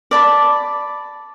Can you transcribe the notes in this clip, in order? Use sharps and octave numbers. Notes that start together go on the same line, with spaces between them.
D5 A5 B5